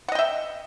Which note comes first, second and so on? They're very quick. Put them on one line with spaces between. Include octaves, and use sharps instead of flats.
F#5 D#5 G5 E5